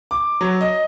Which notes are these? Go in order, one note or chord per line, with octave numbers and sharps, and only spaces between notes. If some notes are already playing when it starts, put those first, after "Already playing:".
D6
F#3
D#5